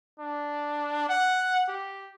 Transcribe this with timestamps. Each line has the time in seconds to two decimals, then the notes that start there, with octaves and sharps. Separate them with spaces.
0.19 D4
1.09 F#5
1.68 G4